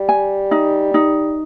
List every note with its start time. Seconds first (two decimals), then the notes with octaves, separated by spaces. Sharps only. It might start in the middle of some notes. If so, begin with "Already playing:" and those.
Already playing: G3
0.09 G#5
0.51 D#4
0.94 D#4